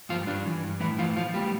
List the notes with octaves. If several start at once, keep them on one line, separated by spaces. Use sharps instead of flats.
G2 F3 F4
G2 D4
E3
G2
A2 E3 E4
E3 F3 F4
A2 F3 F4
E2 G3 G4